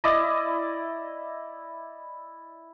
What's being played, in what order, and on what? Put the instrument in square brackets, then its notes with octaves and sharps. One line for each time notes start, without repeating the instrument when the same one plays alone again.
[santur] E4 D5 D#5